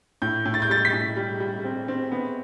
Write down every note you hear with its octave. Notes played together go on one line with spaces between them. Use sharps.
A2 G6
A2
A6
G6
G3 A6
B6
A2
G3
G3
C4
C4
B3